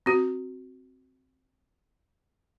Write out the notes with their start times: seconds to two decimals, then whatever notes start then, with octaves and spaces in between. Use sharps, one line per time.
0.06 C4 F#4